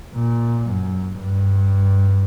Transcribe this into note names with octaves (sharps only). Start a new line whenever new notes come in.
A#2
F#2
G2